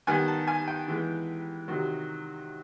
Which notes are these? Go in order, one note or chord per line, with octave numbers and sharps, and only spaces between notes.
D#3 G3 B3 G#5
A5
G#5
G5
E3 G#3 B3
C3 D#3 F#3